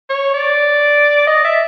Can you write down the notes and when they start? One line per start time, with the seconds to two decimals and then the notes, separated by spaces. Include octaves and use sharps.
0.10 C#5
0.34 D5
1.27 D#5
1.44 E5